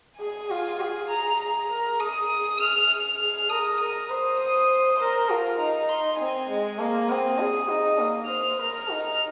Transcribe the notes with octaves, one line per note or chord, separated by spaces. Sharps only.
G#4 G#5
F4
G#4
A#5
A#5
A#4
G#4 D#6
F6
F6
G#4
A#4 D#6
A#4 D#6
C5
D#6
A#4 C5
F4 A#4
D#4 A#5
C6
C4 G#5
G#3
A#3
C4 D#6
G#4
D#4
A#3
C5 F6
A#4
D#4